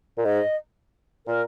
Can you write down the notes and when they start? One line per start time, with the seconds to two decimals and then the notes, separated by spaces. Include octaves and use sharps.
0.18 A#2
0.25 G#2 D#5
1.27 A#2 A#4